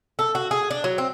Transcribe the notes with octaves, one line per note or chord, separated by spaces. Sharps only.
A4
F#4
G#4
D4
F#3
C4